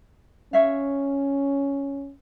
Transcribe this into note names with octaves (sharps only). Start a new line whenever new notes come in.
C#4 C#5 E5 F5